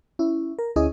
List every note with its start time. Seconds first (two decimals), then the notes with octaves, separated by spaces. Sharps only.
0.19 C#4 E4
0.59 A#4
0.76 D2 C#4 E4 G#4 D#5 D#6